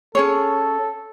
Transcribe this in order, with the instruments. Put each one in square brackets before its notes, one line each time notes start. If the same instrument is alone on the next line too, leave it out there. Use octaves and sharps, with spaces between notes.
[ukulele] C#4 G#4 C#5 [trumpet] A4